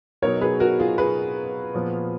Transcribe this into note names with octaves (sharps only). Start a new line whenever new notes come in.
B2 F#3 B3 D#4 A#4 C#5
G#4 B4
F#4 A#4
F4 G#4
G#4 B4
A#2 F3 B3